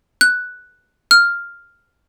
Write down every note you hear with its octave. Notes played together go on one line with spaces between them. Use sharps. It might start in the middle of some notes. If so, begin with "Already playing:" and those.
F#6
F6